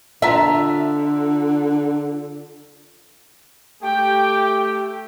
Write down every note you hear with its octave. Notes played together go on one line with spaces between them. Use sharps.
D3 F4 E5 A5 A#5 E6
A3 G4 G5